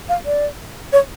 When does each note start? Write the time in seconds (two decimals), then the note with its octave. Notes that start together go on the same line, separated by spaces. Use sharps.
0.09 F5
0.26 D5
0.93 C#5